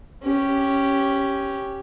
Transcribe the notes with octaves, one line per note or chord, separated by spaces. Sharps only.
C#4 G4